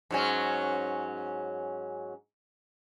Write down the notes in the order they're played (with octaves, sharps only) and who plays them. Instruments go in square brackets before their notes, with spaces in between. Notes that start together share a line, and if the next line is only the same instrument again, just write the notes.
[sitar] G#2 F#3 C#4